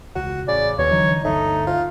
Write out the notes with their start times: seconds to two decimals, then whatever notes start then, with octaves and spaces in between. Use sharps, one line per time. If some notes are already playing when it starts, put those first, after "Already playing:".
0.15 E1 C#2 F#4
0.48 A1 C#3 D5
0.78 D#2 B2 C#5
0.91 D3 E3 F#3 D#4
1.24 G1 D2 A3 D#4
1.67 F4